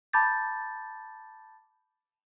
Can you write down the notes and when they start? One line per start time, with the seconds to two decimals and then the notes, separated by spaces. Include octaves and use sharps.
0.13 A5 B5 D6 G6 A6